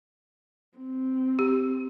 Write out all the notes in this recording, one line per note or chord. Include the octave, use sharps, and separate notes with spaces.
C4
G4